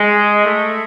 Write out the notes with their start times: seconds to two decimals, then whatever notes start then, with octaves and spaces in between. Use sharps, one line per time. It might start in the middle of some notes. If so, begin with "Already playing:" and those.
Already playing: G#3
0.44 A3